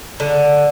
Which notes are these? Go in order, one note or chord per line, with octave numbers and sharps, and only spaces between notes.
D3